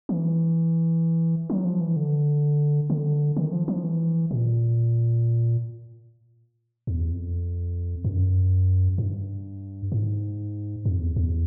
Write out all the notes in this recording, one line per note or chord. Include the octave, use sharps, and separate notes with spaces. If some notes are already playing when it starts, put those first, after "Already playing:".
E3
F#3
F3
E3
D3
D3
D#3
F3
F3
E3
A#2
E2
F2
F#2
G2
G#2
F2
E2
E2